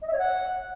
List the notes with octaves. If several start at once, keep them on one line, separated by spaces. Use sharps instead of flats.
D#5
E5
C#5
F#5